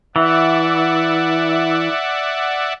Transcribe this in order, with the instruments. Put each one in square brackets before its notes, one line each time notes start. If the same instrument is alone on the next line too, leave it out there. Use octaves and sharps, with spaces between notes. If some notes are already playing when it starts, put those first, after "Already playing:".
[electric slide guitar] E3 [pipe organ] D5 E5 F#5